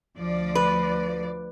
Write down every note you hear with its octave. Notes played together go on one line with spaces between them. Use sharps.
D2 F3 D5
B4